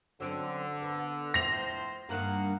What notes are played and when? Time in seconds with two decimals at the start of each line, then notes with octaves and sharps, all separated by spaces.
0.20 D3 F#3 C4 C#4
0.82 B3
1.34 A2 F3 C5 A#6 F7
2.09 G2 D#3 A#3 F#5